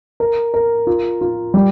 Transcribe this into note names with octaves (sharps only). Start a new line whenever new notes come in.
A#4
A#4
F4
F4
G3